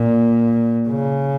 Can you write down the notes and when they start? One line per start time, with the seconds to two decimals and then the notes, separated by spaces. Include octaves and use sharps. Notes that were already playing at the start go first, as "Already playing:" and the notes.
Already playing: A#2
0.89 C#3